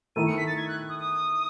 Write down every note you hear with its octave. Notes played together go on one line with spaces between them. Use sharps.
D#3 A3 E4 D#7
C#7
B6
A6
G#6
F#6
D#6
D#6